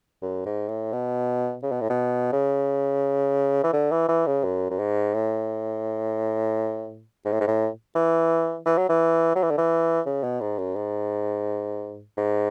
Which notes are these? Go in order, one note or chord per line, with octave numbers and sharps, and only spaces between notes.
F#2
G#2
A2
B2
C#3
B2
A2
B2
C#3
E3
D3
E3
E3
C#3
F#2
F#2
G#2
A2
G#2
A2
G#2
A2
E3
E3
F#3
E3
F#3
E3
D3
E3
C#3
B2
G#2
F#2
G#2
G#2